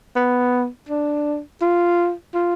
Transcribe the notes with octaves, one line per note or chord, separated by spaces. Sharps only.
B3
D4
F4
F4